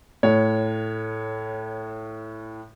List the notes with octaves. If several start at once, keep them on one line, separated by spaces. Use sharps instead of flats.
A2 C#5